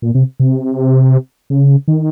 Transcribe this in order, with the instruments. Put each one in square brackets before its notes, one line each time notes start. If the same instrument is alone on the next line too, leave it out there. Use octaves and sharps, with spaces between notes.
[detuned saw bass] A#2
C3
C3
C#3
D#3